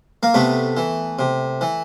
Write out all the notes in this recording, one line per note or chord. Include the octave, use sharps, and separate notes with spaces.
A#3
C3 A3 B3
E3
C3
E3